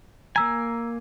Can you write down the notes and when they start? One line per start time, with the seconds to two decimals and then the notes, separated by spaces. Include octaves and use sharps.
0.36 A#3 G#5 A#5 E6